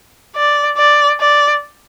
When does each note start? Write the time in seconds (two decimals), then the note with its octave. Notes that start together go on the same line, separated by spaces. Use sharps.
0.36 D5
0.77 D5
1.20 D5